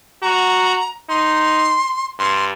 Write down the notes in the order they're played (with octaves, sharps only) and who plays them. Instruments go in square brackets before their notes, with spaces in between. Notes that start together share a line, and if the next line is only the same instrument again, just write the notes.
[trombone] F#4 [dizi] A#5
[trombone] D#4 [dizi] C6
[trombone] G2 [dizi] C6